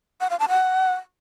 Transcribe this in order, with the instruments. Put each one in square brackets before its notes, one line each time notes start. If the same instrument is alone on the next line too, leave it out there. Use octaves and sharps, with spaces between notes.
[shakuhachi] F#5
F5
A5
F#5